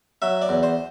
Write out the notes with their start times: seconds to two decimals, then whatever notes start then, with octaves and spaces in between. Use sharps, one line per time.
0.22 F#3 E5
0.42 D5
0.49 E2
0.63 C5